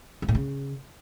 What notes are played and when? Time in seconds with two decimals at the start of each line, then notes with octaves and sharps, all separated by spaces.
0.22 F#2
0.29 A2
0.35 C#3